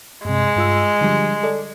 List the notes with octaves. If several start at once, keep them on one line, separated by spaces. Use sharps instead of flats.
G2 C3 G#3
G2 F4 E6
D3 F3 G3
A4 D5